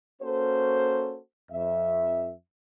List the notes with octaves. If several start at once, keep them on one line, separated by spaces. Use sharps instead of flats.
A#3 C#4 F#4 A4 C5
F2 E5